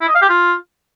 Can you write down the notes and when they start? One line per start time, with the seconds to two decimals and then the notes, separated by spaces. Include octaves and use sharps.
0.01 E4
0.08 D#5
0.15 F5
0.22 G4
0.29 F4